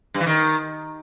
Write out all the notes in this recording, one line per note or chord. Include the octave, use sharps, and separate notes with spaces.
G2
E3
D#3